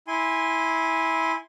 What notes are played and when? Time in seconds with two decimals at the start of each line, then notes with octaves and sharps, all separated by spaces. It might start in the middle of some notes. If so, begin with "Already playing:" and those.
0.08 E4 G#5 C6